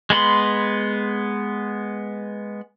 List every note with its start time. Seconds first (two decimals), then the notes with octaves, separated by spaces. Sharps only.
0.10 G#3 B3 B5 C6